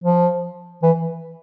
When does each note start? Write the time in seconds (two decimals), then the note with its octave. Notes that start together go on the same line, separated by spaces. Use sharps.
0.04 F3
0.83 E3